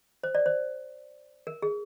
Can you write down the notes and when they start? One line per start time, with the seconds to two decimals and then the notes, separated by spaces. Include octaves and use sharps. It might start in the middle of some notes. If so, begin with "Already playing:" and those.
0.23 C5
0.35 D5
0.46 C5
1.47 A#4
1.62 G#4